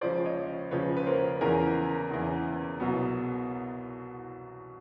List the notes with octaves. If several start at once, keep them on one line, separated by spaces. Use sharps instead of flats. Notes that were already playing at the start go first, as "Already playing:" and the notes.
C#2 C#3 F3 C5 D5
C#5 D#5
C#2 C#3 F3 B4 C#5
B4
A#4 C5
E2 C#3 E3 G#4 A#4
E2 C#3 E3
C2 B2 F#3 B3